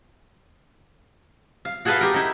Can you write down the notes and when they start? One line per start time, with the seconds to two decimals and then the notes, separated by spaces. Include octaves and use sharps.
1.65 F5
1.85 F#4 G#4 A4 B4 E5 F5
2.01 G4 A#4
2.14 D#4 E4